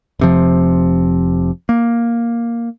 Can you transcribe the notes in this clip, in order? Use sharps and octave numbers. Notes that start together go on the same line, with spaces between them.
F1 C3 F3
A#3